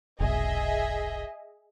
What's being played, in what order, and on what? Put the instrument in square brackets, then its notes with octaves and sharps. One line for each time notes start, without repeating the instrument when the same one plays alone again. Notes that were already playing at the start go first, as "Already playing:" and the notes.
[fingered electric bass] F1 B1 [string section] G#4 D#5 E5